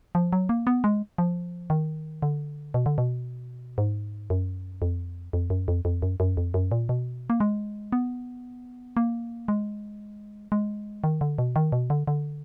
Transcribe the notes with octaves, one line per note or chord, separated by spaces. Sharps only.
F3
F#3
A#3
B3
G#3
F3
D#3
D3
B2
D3
B2
G#2
F#2
F2
F2
F#2
F2
F2
F#2
F#2
F2
F#2
A#2
B2
A#3
G#3
B3
A#3
G#3
G#3
D#3
D3
B2
D#3
B2
D3
D3